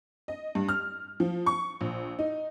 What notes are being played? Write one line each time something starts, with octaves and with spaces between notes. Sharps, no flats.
D#5
G2
F6
F3
C#6
A#1
D#4